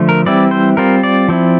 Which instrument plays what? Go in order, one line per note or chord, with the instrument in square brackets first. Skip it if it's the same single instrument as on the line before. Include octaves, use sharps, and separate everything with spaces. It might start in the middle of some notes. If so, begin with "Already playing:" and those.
Already playing: [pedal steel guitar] D3 F3 A3
A#4
E3 G3 C4 E4 D5
C5
G3 C4 F4 A#4
D5
F3 C4 E4